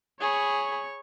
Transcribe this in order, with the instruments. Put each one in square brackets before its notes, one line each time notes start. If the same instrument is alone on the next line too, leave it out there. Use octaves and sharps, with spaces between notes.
[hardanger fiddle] G#4 B5 [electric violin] C#5 C#6